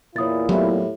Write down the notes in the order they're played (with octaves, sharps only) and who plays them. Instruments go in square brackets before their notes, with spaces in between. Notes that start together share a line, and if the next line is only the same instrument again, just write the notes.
[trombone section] E2 A#2 E4 [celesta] C#5 D#6 A6
[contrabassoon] A2 [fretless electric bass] F#3 B3 [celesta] G4 E5